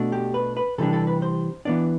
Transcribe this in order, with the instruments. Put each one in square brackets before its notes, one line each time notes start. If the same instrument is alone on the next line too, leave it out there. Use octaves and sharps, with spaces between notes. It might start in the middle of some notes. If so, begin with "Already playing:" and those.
Already playing: [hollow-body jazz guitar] B2 A3 D4
G4
B4
B4
C3 E3 G3 D4 A4
A4
B4
C5
E3 B3 D4 D5